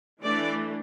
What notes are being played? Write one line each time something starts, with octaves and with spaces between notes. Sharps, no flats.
E3 A3 D4 D5